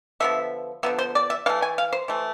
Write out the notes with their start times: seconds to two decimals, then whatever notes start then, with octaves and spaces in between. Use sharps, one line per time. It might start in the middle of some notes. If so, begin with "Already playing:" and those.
0.20 D3 F3 B3 E5
0.83 D3 F3 B3 E5
0.99 C5
1.15 D5
1.30 E5
1.46 E3 F5
1.49 A3
1.62 G#5
1.78 F5
1.93 C5
2.08 E3 A3